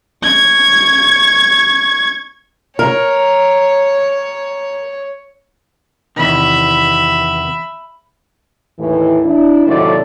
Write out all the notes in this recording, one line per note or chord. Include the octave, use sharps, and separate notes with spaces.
C#6 G#6
A#4 C#5
E2 C3 D#3 E5 B5
D#2 A2 E3
D4 E4
D#2 A2 C3 F#3 A3 D5